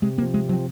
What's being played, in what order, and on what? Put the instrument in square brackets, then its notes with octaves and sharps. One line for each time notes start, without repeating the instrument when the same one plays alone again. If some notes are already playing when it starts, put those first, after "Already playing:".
[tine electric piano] C3 [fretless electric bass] G#3
[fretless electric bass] A#3 [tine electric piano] C4
[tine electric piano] F3
[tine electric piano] C3 [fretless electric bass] G#3
[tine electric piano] F3 [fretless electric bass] F#3
[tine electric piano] C4